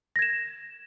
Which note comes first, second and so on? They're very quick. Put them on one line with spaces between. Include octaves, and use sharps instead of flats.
A#6 G#6 E7